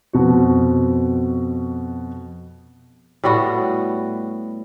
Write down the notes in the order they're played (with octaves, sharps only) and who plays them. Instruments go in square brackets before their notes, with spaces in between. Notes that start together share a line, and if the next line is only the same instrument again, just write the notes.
[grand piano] F2 B2 F#4
[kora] A2 G3 B3 F#4